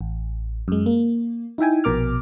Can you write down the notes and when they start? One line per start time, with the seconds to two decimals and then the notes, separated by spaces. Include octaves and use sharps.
0.01 A1
0.68 F#2 G#3
0.86 A#3
1.58 D#4 E4 E5 G5 G#5
1.84 A#1 B2 A#4 D6 F6